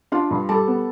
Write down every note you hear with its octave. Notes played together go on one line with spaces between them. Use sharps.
D4 F4 F5
G2
G3 A4 A5
B3